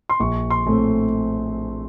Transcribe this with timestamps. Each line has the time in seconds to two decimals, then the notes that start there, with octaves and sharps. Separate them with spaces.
0.09 C6
0.20 A#1 C#6
0.50 C6
0.66 A2 A3 C4